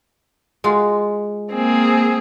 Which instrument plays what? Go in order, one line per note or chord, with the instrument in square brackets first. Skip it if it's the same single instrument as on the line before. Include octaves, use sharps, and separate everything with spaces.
[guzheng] G#3 F4 F#4
[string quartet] A#3 C4 G#4